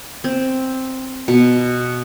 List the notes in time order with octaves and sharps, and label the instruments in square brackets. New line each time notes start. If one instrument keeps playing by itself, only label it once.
[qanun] C4
B2